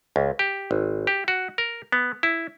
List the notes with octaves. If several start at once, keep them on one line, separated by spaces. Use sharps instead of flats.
C#2
G4
G#1
G4
F#4
A#4
B3
E4